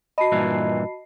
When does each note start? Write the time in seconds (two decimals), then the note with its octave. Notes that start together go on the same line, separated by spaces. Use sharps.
0.18 F#4 D#5 A5 B5 C7
0.32 G2 A#2 E3